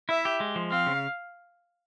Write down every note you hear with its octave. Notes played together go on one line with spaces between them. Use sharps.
E4 E5
G4
G#3
F3
C4 F5
C#3